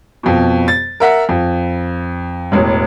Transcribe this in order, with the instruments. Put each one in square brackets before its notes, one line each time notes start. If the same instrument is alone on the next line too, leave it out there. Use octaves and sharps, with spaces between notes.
[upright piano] F2 B2
A6
A#4 E5 F#5
F2
E1 A1